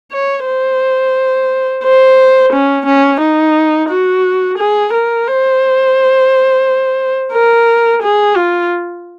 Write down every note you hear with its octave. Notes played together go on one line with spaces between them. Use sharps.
C#5
C5
C5
C#4
C#4
D#4
F#4
G#4
A#4
C5
A#4
G#4
F4